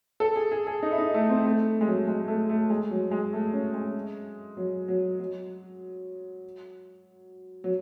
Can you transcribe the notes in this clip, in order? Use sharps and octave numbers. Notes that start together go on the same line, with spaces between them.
A4
G#4
G#4
G#4
D#4
E4
D#4
A3
C4
A3
G#3
F#3
G#3
A3
A3
G#3
F#3
G#3
A3
C#4
G#3
F#3
F#3
F#3
F#3